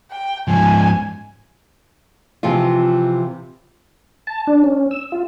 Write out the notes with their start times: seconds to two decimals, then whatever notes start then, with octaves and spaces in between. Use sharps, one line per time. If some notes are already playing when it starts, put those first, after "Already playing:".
0.11 G5
0.48 G#2 F3 G#5
2.43 C3 E3 F3 F4
4.27 A5
4.47 D4
4.64 C#4
4.91 E6
5.12 F4